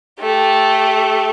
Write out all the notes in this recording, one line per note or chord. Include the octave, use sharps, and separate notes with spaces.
A3 G4